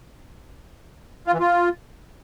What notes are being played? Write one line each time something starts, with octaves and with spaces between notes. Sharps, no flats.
F4
E3
F4